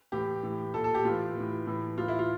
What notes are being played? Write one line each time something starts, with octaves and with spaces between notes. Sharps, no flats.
A2 E3 G4
A2 E3
A#2 A4
A4
G4
A2 E3 F4
A2 E3
A2 E3
A2 E3 F4
E4
F4